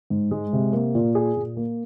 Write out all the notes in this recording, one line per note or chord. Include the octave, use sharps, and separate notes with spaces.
G#2
G#3
C3
A#3
A#2
G#4
A#2
A#3